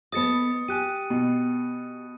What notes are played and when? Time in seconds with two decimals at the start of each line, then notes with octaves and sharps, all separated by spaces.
0.12 B3 A4 D#5 D#6 A6 C#7
0.68 G4 G#5 F#6 D#7
1.10 B2